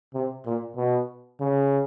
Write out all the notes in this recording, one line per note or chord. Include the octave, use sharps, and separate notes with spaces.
C3
A#2
B2
C#3